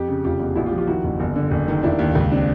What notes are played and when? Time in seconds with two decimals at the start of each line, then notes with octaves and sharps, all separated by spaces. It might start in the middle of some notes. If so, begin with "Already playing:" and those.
Already playing: F2 G4
0.08 C#3
0.24 F1 F4 G4
0.40 E2
0.55 A#1 E4 F#4
0.66 F4 G4
0.73 F3
0.78 F4 G4
0.87 D#3 E4 F#4
1.04 F#1
1.20 G1
1.36 D3
1.51 F#1
1.68 D#3
1.83 F1 D4 E4
1.99 D#2
2.15 C#2
2.32 C4 D4